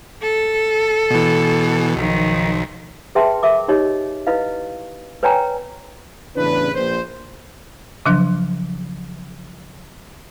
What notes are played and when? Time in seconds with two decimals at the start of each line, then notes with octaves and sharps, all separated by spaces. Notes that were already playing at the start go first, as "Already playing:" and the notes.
0.22 A4
1.10 B2 E3
1.96 B1 D#3 F3
3.15 G#4 B4 E5 G5 A5 C6
3.43 A#4 E5 D6
3.68 D#4 G4 C#5 D#5
4.27 E4 B4 D#5 F5
5.23 B4 C#5 D5 G5 G#5 A#5
6.36 A1 E2 C#3 D4 B4
6.75 A#1 C5
8.06 C#3 F3 F#3 D4